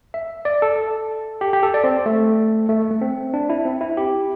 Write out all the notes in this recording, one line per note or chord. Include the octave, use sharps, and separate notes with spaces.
E5
D5
A4
G4
G4
A4
D5
C4
A3
A3
A3
C4
D4
E4
C4
E4
G4